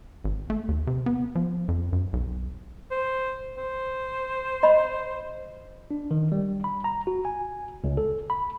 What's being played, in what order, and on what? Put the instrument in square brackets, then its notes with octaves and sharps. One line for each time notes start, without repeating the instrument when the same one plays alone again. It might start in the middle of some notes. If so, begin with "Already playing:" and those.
[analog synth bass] G#1
A3
D#2
C3
B3
F3
F2
F#2
B1
[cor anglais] C5
C5
[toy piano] D#5 B5
[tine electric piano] D4
D#3
G3
B5
A#5
F#4
G#5
C#2
A4
B5